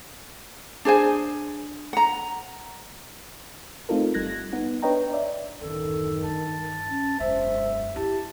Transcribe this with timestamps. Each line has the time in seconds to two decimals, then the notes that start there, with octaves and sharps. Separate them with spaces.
0.85 D4 G#4 C5 G#5
1.93 F#5 A#5
3.89 A3 C4 D#4 F4 A4 A#4
4.14 G1 G3 F#6 G#6 A#6
4.53 B3 D#4 F#5
4.82 D4 B4 C#5 D#5 G5 A#5
5.13 D5 E5
5.61 D1 F#2 D#3 A4
6.23 G2 A5
6.90 C#4
7.20 E1 F#2 C5 E5
7.96 E4 G4 A5